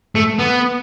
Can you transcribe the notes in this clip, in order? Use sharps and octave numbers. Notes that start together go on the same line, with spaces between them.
A3
B3